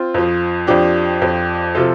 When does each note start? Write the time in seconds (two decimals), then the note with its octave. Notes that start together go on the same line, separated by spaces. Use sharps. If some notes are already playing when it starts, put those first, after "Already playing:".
Already playing: C4 F4
0.14 F2 F3
0.67 F2 F3 D4 G4
1.22 F2 F3
1.75 C3 F3 F4 A4